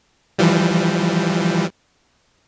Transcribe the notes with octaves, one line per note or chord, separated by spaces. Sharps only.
E3 F3 G3